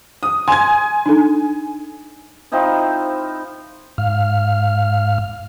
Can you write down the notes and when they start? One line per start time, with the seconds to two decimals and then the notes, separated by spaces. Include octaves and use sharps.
0.23 D#6
0.48 G#5 C6 G#6
1.06 D4 D#4 A4
2.52 F3 C4 D#4 E4
3.98 G#2 F5 F6